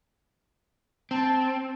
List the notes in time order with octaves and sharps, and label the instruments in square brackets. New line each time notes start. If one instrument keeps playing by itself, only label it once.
[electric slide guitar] C4 [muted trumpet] A5